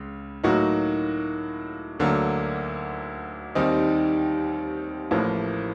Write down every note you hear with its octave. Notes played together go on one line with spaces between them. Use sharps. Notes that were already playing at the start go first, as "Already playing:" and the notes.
Already playing: C#2 C#3
A2 F#3 A#3 D#4 F#4
D2 D3 F#3 A#3
D#2 D#3 G3 C4 D#4
A1 A2 F3 A#3